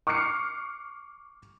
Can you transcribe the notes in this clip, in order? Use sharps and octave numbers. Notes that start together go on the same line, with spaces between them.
C#6 D6 F6 F#6 C7 C#7